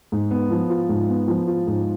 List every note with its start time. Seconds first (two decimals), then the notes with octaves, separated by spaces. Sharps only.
0.12 G#2
0.31 B3
0.51 F3
0.70 F4
0.89 G#2
1.09 B3
1.28 F3
1.47 F4
1.67 G#2